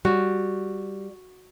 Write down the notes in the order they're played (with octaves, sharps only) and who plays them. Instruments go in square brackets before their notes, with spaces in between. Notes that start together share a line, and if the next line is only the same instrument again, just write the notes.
[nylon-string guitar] G3 [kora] F#4